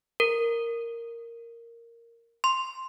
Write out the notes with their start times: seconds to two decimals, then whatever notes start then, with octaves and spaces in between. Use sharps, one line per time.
0.20 A#4
2.44 C6